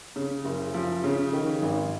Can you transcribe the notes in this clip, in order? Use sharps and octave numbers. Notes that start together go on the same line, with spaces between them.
C#3
F#1
F3
C#3
D#3
G#1